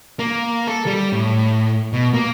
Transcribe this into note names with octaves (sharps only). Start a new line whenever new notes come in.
A#3
A4
G3
A2
B2
A#3